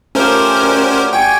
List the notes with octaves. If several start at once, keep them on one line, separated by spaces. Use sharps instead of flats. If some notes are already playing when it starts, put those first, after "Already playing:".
A3 C#4 F4 G4 A#4 C5
F#4 D5
G5 G#5 C#6